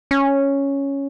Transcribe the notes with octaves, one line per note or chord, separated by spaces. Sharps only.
C#4